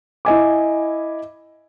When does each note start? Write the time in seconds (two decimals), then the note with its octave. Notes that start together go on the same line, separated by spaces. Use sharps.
0.25 E4 D#5 G#5 D6